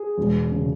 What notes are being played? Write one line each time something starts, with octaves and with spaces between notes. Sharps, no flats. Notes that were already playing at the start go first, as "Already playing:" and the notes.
Already playing: G#4
E1
C#3